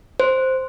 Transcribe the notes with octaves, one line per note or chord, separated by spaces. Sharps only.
C5